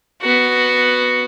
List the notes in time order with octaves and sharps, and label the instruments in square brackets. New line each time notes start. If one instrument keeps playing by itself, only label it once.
[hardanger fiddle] B3 F#4